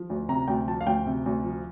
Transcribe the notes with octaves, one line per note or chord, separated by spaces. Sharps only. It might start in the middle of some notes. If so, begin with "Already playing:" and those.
Already playing: F3
D2
C3 A#5
D2 G5
F3 A5
F5
D2 G5
C3
D2
F3